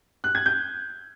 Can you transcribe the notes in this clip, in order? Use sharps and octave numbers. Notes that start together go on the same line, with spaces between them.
F#6
G#6
G6